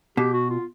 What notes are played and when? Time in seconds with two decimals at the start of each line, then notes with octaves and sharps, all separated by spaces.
0.17 B2 G4
0.33 F#4
0.50 F4